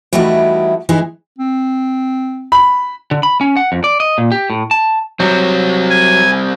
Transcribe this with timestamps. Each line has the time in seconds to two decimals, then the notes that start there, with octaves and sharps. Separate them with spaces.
0.13 E3 G3 A3 D#4 E4 F#4
0.89 E3 G#3 D#4 E4 G#4
1.39 C4
2.52 B5
3.11 D3
3.23 B5
3.41 C#4
3.57 F#5
3.72 F2
3.84 D5
4.00 D#5
4.18 A#2
4.32 G4
4.50 A2
4.71 A5
5.20 F#3 G3 C4
5.90 G#5